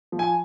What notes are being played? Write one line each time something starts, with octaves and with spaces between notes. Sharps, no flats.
F3
G#5